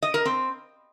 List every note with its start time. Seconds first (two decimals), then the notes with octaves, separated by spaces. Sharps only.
0.02 D#5
0.14 A#4
0.25 C4